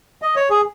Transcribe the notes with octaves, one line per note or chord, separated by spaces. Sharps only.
D#5
C#5
G#4